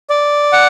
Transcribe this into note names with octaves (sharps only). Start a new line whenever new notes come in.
D5
F#5